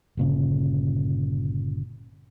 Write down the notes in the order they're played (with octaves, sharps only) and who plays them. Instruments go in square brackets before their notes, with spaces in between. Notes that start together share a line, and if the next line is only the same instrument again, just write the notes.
[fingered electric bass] G1 A#2 C#3